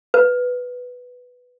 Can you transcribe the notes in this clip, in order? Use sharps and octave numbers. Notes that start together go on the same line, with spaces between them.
B4